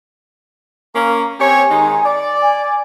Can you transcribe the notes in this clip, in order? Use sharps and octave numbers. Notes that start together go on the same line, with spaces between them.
A#3 C#4 A#5
C4 G4 C#5 G#5
D#3 G#3 D#4
D5
G#5